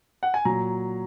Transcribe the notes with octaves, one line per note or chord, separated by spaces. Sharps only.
F#5
G#5
A#2 F#3 A#5